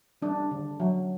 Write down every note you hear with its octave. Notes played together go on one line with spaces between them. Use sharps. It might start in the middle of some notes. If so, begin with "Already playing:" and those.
G3 D4
D3
F#3